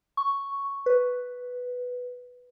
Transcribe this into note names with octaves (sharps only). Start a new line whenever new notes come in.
C#6
B4